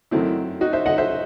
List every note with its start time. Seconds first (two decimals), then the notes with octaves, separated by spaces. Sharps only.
0.11 F#2 D#3 F#3 A3 C4 E4
0.61 D#4 F#4
0.73 C5 E5
0.86 D#5 F#5
0.98 C5 E5